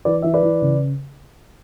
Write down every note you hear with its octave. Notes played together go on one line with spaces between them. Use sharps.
E3 B4 D5
E3 E5
B4 D5
E3
C#3